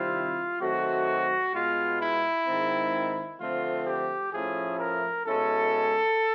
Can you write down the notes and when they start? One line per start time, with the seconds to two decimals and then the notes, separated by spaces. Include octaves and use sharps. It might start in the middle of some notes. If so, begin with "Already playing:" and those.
Already playing: C3 D#3 G3 C4 E4 F4
0.61 D#3 F#3 A3 C4 F#4
1.54 B2 G#3 B3 F4
2.00 E4
2.46 G#2 D#3 G#3 C4 D#4
3.40 D3 F3 A3 C4 F4
3.86 G4
4.33 A2 F3 A3 C#4 E4 G#4
4.79 A#4
5.26 B2 G#3 C#4 E4 A4